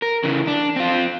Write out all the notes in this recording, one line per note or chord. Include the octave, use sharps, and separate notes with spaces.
A#4
C#3 E3
D4
C4 F4